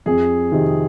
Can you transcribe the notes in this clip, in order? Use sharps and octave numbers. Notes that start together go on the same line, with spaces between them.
F2 G#4
C3 D#3